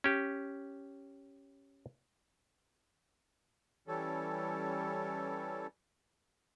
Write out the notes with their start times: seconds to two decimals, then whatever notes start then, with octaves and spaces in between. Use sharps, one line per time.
0.04 C#4 G4
3.88 E3 G3 C#4 A4